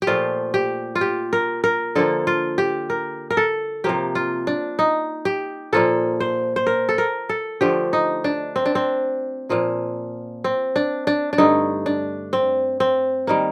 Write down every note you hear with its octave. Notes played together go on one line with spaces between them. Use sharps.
G4
A#2 F3 A3 F4
G4
F4
G4
A#4
A#4
D3 F3 A#3 A4
F4
G4
A#4
A#4
A4
C3 F3 A#3 G4
F4
D4
D#4
G4
A#2 F3 A#3 A4
C5
C5
A#4
A4
A#4
A4
D3 F3 A3 G4
D#4
D4
C4
D4
C4
A#2 F3 A#3
C4
D4
D4
D4
G2 D3 A3 D#4
D4
C4
C4
D#3 G3 A#3